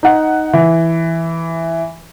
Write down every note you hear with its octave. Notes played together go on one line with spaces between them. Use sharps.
D#4 F#5
E3